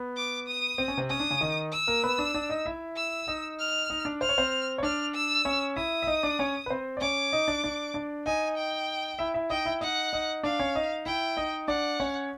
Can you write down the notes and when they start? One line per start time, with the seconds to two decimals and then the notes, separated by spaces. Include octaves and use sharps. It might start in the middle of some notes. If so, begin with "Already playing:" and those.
Already playing: B3
0.17 D6
0.48 D#6
0.78 C4
0.88 C#4
0.97 C3 C4
1.10 C#4 D#6
1.20 D4
1.30 C#3 C#4
1.41 D#3 D#4
1.72 E6
1.87 A#3 A#4
2.04 B3 B4
2.19 D4 D5
2.34 D4 D5
2.49 D#4 D#5
2.66 E4 E5
2.97 E6
3.28 D#4 D#5
3.59 F6
3.90 D#4 D#5
4.05 D4 D5
4.21 C5 F6
4.29 C#5
4.38 C4 C5
4.78 C#5
4.83 D4 D5 F6
5.15 E6
5.45 C#4 C#5
5.76 E4 E5 D#6
6.03 E5
6.07 D#4 D#5
6.23 D4 D5
6.39 C#4 C#5
6.66 B4
6.70 C4 C5
6.97 D5
7.01 C#4 C#5 D6
7.33 D#4 D#5
7.48 D4 D5
7.64 D4 D5
7.94 D4 D5
8.26 D#4 D#5 G#5
8.57 G5
9.19 E4 E5
9.34 E4 E5
9.50 D#4 D#5 G5
9.65 E4 E5
9.81 D#4 D#5 F#5
10.13 D#4 D#5
10.43 D4 D5 F5
10.59 C#4 C#5
10.75 D#4 D#5
11.06 E4 E5 G5
11.37 D#4 D#5
11.68 D4 D5 F#5
12.00 C#4 C#5